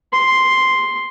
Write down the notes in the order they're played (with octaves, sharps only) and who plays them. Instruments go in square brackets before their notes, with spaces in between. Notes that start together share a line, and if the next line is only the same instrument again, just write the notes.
[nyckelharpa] C6